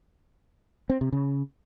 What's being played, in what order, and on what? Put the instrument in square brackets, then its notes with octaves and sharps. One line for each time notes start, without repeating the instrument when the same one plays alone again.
[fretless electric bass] C4
C3
C#3